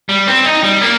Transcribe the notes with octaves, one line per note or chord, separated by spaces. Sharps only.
G3
C4
D#4
G3
A#3